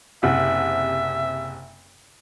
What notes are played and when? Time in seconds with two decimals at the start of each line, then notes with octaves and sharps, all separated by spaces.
0.23 F#1 C3 E5 F#5